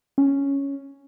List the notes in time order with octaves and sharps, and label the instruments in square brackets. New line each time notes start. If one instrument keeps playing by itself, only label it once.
[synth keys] C#4